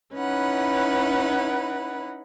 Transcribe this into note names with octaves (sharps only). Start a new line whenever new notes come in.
C#4 D#4 E4 B4 F#5 B5